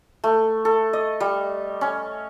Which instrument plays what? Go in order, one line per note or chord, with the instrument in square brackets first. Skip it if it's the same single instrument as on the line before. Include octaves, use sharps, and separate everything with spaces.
[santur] A3
A4
D#5
G3
C#4